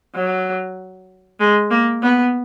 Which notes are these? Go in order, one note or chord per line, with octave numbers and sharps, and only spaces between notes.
F#3
G#3
A#3
B3